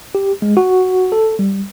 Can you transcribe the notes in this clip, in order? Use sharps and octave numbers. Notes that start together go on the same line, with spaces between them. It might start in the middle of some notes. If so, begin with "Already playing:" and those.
G4
G#3
F#4
A4
G3